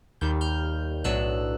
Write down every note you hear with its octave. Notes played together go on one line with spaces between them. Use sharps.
D#2 D#3 G3 G6
F6 G6
B1 A2 F#3 B3 D4 E6 F#6